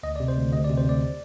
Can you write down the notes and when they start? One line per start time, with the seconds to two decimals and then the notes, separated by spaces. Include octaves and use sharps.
0.03 D2 D#5
0.16 D5
0.20 C3
0.28 C5
0.37 D2
0.52 D2 D#5
0.64 D5
0.69 C3
0.77 C5
0.85 D2 D5